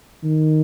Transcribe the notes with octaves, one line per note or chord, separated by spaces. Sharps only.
D#3